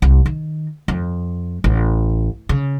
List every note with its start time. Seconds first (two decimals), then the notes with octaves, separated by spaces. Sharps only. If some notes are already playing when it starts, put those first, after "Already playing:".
0.02 C2
0.26 D#3
0.88 F2
1.64 A1
2.49 C#3